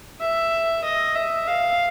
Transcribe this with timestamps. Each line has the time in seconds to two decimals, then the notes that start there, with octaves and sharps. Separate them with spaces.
0.20 E5
0.84 D#5
1.15 E5
1.47 F5